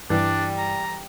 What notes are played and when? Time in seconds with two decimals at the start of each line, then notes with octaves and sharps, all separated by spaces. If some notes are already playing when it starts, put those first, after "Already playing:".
0.10 G2 E3 G3 D4
0.58 A#5